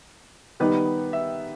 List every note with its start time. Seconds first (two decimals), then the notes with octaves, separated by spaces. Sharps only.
0.60 D#3 G3 B3 D#4 G4 B4
1.13 E5